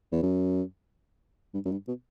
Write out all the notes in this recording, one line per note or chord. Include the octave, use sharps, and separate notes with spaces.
E2
F#2
G2
F#2
G2
B2